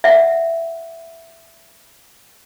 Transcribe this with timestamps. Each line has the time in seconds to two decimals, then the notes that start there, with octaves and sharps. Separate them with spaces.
0.04 E5 F#5